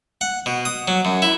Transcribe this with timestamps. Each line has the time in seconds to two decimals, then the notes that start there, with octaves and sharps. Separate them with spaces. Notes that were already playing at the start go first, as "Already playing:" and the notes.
0.21 F#5
0.46 B2
0.65 D#6
0.88 F#3
1.05 F#2
1.22 E4